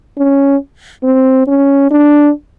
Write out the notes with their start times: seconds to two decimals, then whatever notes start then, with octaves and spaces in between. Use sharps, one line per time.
0.17 C#4
1.04 C4
1.48 C#4
1.91 D4